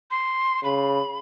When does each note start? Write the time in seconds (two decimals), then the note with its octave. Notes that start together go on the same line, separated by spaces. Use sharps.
0.11 C6
0.64 C#3 B5